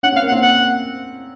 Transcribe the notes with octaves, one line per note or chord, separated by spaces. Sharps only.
C#4 F#5
C4 F5
A#3
F#5
C4
F#5